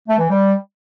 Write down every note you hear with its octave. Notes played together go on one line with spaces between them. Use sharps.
A3
E3
G3